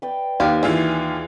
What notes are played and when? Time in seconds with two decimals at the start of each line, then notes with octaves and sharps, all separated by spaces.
0.02 B4 D5 G5
0.40 D#2 G4 F5
0.63 E3 F4 G#4 E5